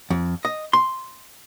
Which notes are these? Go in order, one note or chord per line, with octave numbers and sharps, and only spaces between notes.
F2
D#5
C6